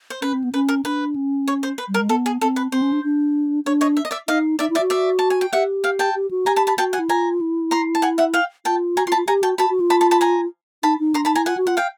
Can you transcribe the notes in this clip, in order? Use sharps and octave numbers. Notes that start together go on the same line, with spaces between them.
C5
C#4 B4
C4
B3
C#4 B4
A#4
D4 B4
C#4
C#5
C5
B4
G3
A#4
G#3
B3 A4
G#4
C4 A4
B4
C4 C5
C#4
D4
D4
D4 C#5
C#5 D#5
E5
D#5
D5 E5
D#4 D#5 F5
D#4 D5 E5
E4
D5 E5
F#4
D5 E5
A5
G#5
G5
G4 E5 F#5
F5 G5
G5 A5
G4
F#4
G4 G#5 A#5
A5 B5
A5 B5
F#4 G5 A5
F#5 G#5
E4
F4 G#5 A#5
E4
A#5 C6
A5
F#5 G#5
E5 F#5
F5 G5
F4 G5 A5
F#4 G#5 A#5
F4 C6
A5 B5
F4
G4 G#5 A#5
F#4 G5 A5
F#4 A5 B5
F#4
F4
A5 B5
A5 B5
A5 B5
G#5 A#5
D#4 A5 B5
D#4
D4 A#5 C6
D#4 A5 B5
E4 G#5 A#5
F4 F#5 G#5
F#4
F4 F#5
F5 G5